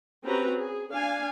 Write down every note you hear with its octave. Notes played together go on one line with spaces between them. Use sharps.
C4 C#4 F#4 G4 B4 A#5
G#4
D4 F5 G#5